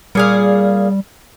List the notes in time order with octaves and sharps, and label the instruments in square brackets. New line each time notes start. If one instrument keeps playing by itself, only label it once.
[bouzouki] A#2 G#4 F5 [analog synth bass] G3